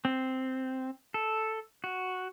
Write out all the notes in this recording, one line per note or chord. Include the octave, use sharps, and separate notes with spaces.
C4
A4
F#4